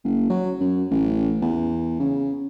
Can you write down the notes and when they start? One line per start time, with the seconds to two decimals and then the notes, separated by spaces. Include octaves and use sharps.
0.05 F#1
0.30 F#3
0.60 F#2
0.90 A1
1.41 E2
2.00 C#3